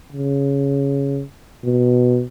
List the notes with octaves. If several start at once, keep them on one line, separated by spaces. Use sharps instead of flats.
C#3
B2